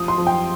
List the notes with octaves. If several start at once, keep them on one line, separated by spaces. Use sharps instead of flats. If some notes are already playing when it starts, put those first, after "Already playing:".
Already playing: F3 D#6
C6
F3
G5